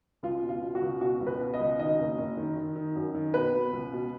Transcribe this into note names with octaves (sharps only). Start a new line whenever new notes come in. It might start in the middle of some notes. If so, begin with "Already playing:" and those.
C#2 F4
B2
F4
B2
F#4
C#2
B2 F#4
C#2
B4
B2
D#5
C#2
D#3 D#5
F#1
F#1
D#3
D#3
D#3
F#2
D#3
B2 B4
B2
C#2
B2